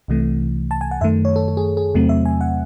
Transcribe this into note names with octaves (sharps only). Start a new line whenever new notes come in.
C2 C3 E3 A3
A5
G#5
F#5
F#2 D#3 A3 E5
C#5
A4
A4
G#4
G#4
E2 C3 F#3 A3 C4
E5
G#5
F#5